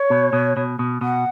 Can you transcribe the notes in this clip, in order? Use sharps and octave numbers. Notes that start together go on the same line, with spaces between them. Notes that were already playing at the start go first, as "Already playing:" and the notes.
Already playing: C#5
B2
B2
B2
B2
B2 F#5